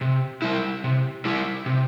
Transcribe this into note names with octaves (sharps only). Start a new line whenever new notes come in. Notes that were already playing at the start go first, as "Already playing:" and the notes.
C3
G3 E4
C3
G3 E4
C3